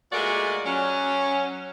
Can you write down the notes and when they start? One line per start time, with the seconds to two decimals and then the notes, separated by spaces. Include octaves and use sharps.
0.12 A#2 G#3 A3 F#4 A#4 D5
0.65 F#3 C#4